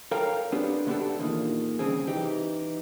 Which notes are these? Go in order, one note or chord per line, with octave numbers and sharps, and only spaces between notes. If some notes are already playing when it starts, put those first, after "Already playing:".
A4 A#4 C#5 F5 G5 A#5
B3 C4 D4 G4
C3 B3 D4 G4 A4
E2 A#2 D#3
C2 C#3 C4 G#4
E3 D#4 G4